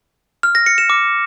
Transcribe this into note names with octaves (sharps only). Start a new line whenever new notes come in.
F6
A#6
C#7
E7
D6